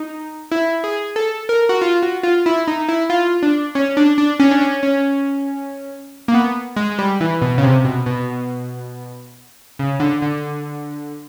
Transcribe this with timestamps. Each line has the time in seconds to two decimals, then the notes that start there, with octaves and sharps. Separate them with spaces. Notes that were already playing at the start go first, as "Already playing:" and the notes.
Already playing: D#4
0.51 E4
0.84 G#4
1.16 A4
1.49 A#4
1.69 F#4
1.81 F4
2.03 F#4
2.23 F4
2.46 E4
2.67 D#4
2.88 E4
3.10 F4
3.43 D4
3.75 C#4
3.97 D4
4.18 D4
4.40 C#4
4.51 D4
4.61 C#4
4.83 C#4
6.28 A#3
6.34 B3
6.76 G#3
6.91 G#3
6.99 G3
7.20 E3
7.42 B2
7.58 C#3
7.63 C3
7.85 B2
8.06 B2
9.79 C#3
10.00 D3
10.22 D3